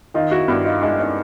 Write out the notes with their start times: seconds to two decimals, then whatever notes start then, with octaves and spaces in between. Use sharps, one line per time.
0.14 D#3 D#4 F4
0.31 E4 F#4
0.48 G2 E4 F#4
0.65 D#4 F4
0.82 G#3 D4 E4
0.99 C#4 D#4